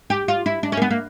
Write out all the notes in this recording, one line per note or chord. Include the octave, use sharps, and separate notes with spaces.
G4
F4
E4
D4
C#4
A#3
B3
A#3